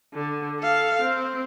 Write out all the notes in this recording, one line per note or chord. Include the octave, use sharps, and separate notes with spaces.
D3
A4 F5
C4